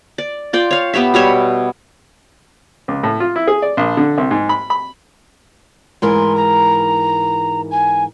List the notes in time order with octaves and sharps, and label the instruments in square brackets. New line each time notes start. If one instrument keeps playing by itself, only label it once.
[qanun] D5
F4 D5 G5
C#5 F5
B3 G4 C#5 E5
B2 G3 C#5 E5
[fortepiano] C#2
A2
F4
E4
G#4
D5
A#1
D3
C2
G#2
B5
B5
[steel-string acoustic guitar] G#2 E3 A#4 [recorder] C6
[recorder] A#5
G#5